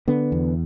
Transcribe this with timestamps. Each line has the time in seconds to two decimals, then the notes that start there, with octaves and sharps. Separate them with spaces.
0.08 D3 B3
0.32 E2